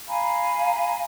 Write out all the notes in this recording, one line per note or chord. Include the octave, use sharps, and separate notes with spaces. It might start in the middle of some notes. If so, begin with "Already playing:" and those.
F5 G#5 A#5 B5